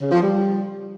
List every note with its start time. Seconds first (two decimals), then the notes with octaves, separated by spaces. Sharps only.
0.01 C#3
0.11 F3
0.22 G3